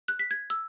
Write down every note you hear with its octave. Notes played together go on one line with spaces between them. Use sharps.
F#6
B6
G#6
E6